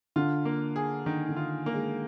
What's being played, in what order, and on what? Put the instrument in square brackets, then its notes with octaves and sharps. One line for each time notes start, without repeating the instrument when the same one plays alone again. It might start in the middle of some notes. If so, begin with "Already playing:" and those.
[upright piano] D3 [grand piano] F4
[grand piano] A#3
G#4
[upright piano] D3 [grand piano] D#3
[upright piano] D3
[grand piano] F4
A#3
[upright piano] G#3